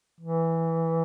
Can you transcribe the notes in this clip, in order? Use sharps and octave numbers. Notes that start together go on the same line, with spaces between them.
E3